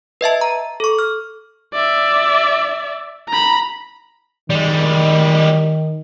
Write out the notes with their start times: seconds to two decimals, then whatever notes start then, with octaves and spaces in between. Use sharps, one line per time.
0.21 B4 D#5 E5 A5
0.41 A#5
0.80 A4 C#6
0.99 F6
1.73 D5 E5
3.28 A#5 B5
4.50 D#3 G3 G#3